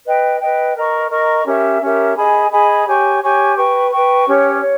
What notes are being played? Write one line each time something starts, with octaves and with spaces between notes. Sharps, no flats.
B4 D#5 G5
B4 D#5 G5
A#4 D#5 A#5 C#6
A#4 D#5 A#5 C#6
C#4 G4 A#4 E5
C#4 G4 A#4 E5
G#4 D#5 G#5 B5
G#4 D#5 G#5 B5
G4 C#5 G#5 C#6
G4 C#5 G#5 C#6
B4 G5 C#6
B4 G5 C#6
C#4 G4 C#5
C#5